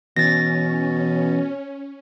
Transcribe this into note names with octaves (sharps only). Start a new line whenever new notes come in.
B2 E3 C#4 A6 A#6